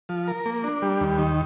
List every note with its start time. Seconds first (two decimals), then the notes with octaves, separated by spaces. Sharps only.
0.09 F3
0.28 A#4
0.46 A#3
0.64 D4
0.82 G3
1.01 D#2
1.18 D#3